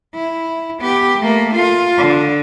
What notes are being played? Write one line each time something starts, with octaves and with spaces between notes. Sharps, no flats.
E4
B3 G4
A3 A#3
F4
D3